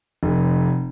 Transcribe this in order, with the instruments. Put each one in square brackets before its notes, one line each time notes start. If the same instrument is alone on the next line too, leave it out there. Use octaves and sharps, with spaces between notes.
[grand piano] F1